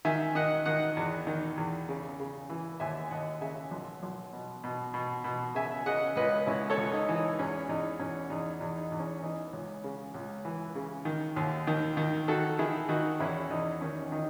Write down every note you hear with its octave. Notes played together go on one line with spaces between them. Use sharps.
D#3 E5 G#5
D#3 D#5 F#5
D#3 D#5 F#5
E2
D#3
E2
C#3
C#3
E3
D#2 E5 G#5
D#2 D#5 F#5
C#3 E5 G#5
B1
B1
B2
B2
B2
B2
C#3 E5 G#5
C#3 D#5 F#5
C#2 B4 D#5
C#2 C#4 E4
A4 C#5
C#2
D#4
E3
D#4
E2 C#4
E2 D#4
E2 C#4
E2 D#4
D#4
E2
D#4
E2
C#4
E3 D#4
C#2
C#3
C#2
E3
C#3
D#3
D#2
D#3
D#3
D#3 F#4 A4
D#3 E4 G#4
D#3 D#4 F#4
E2 C#4 E4
E2 D#4
D#3 C#4
D#3 D#4